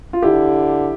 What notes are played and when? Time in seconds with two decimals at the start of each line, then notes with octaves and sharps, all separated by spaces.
0.13 F4
0.22 D3 E4 G4